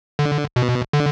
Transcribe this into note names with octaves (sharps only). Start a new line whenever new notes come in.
D3
B2
D3